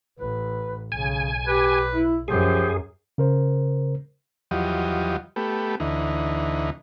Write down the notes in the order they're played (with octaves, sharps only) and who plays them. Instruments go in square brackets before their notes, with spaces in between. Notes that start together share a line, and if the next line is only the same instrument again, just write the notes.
[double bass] A1 [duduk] B4
[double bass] B1 [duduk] C#3 [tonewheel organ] G#5
[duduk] G4 [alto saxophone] B4
[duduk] E4
[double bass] F#2 [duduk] F3 [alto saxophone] G4 [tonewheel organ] G#4
[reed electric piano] C#3 A#4 C5
[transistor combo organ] E2 F3 F#3 G4 D#5
A3 B3 G4
D2 E3 D#4